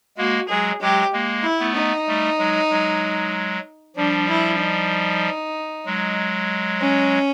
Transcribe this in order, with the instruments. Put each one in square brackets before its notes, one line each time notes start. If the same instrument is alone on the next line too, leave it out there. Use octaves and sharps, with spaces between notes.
[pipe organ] G#3 A#3 [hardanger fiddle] F#4
[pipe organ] F#3 G#3 [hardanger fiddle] G#4
[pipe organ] F#3 G#3 [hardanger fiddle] G4
[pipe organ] G#3 A#3
[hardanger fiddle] E4
[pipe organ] A3 B3
[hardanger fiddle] D#4
[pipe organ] G3 A3
F#3 G#3
F#3 G#3
[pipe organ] F3 G3 [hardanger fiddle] D4
[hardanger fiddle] E4
D#4
[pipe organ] F#3 G#3
[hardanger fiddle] C#4